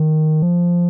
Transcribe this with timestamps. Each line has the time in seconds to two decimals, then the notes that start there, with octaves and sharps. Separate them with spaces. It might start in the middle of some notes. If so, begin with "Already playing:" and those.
Already playing: D#3
0.42 F3